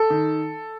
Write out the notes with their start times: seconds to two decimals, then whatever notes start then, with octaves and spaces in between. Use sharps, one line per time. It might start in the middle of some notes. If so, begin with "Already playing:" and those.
Already playing: A4
0.10 D#3